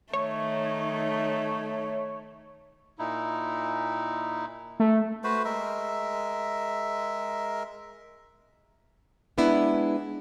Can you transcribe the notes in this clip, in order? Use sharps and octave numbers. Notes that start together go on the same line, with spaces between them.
D#3 A3 D#4 C#5
A#2 D#4 E4
A3
A3 F#4 B4 C5
G#3 A#4 E5
G#3 B3 D4 E4